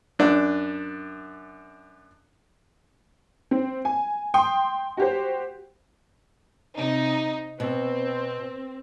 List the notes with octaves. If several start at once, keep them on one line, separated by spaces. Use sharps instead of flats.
F#2 D4
C4
G#5
G5 C6 D#6
F#4 G4 C5
C3 D#4
B2 C4